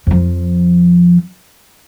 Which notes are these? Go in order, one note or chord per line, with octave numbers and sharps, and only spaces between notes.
F2 F3